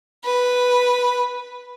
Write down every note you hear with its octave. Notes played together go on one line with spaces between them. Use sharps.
B4